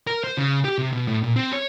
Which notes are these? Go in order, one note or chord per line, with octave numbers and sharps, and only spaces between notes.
A#4
C5
C#3
G4
C3
B2
A2
A#2
C4
C#5